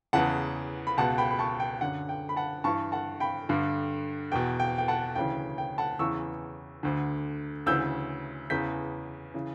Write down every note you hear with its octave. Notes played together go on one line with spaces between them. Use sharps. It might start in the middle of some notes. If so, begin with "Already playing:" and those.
E2 C#3 E3 F#5 A5
B5
C#2 B2 F#5 A5
G5 B5
B5
A5 C#6
G5
F#2 D3 F#5
G5
B5
F#5 A5
G2 E3 A5 C#6
F#5 A5
G5 B5
G2 D3
E2 B2 G5
G5
G5
F#5 A5
D2 C#3 E3 G5
G5
F#5 A5
E2 C#3 E3 C#6 E6
D2 D3
D2 C#3 E3 E6 G6
E2 C#3 E3 G6 B6
C#3 E3